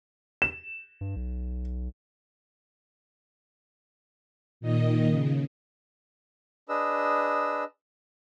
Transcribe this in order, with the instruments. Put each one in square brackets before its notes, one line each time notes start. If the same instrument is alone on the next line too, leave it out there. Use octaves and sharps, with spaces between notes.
[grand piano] E7
[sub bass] G2
B1
[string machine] A#2 D#3 D#5
C#3
[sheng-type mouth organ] D4 G#4 B4 D#5 E6